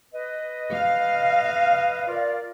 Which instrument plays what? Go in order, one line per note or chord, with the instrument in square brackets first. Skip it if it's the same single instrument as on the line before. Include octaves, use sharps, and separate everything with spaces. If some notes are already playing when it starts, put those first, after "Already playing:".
[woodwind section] B4 D#5
[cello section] F5
[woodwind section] F4 A#4 D5